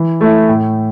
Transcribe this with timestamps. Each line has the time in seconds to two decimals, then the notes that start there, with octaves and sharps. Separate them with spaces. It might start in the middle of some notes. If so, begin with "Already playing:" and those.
Already playing: E3
0.21 A3 E4
0.48 A2